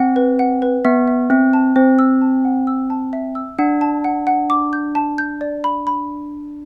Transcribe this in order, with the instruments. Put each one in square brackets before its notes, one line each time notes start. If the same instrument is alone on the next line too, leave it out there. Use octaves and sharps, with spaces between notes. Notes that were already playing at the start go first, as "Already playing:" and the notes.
Already playing: [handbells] C4 [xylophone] F#5
[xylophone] B4
F#5
B4
[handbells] B3 [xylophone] E5
[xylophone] E5
[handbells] C4 [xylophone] E5
[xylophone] A5
[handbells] C4 [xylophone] C5
[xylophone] E6
A5
F#5
E6
A5
E5
E6
[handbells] D4 [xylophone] F#5
[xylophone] A5
F#5
F#5
D6
G6
A5
G6
D5
B5
B5